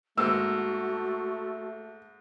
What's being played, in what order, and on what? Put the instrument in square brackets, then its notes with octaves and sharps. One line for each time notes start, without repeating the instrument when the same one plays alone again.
[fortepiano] G#2 A#3 [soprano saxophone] A3 [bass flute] F#4 [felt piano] E6